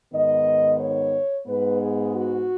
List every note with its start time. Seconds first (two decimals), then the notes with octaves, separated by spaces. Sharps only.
0.13 G#2 D#3 B3 D#5
0.80 C#5
1.47 G#2 G#3 B3 B4
1.81 G#4
2.14 F#4